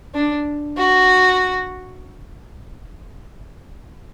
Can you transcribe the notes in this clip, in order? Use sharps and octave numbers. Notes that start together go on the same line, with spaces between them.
D4
F#4